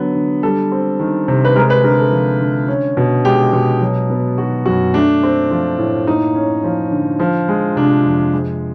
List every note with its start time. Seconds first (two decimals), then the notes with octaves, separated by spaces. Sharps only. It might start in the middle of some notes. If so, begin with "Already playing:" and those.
Already playing: D3 F#3 B3
0.15 D3
0.43 G3 A4
0.72 C4
1.00 D#3
1.28 C3
1.45 B4
1.56 G#3 A#4
1.70 B4
1.84 D3 A#4
1.99 A4
2.12 F3
2.41 D3
2.68 C#4
2.97 B2
3.25 G#3 G4
3.53 B2
3.81 F#3
4.10 B3
4.37 D#3 F#4
4.66 F#2 F#4
4.94 A3 D4
5.23 C4
5.51 F3
5.79 A2
6.07 A#3 D#4
6.35 C#4
6.64 F3
6.91 D3
7.20 F3
7.48 G#3
7.76 C3 D4
8.05 F2
8.33 G#3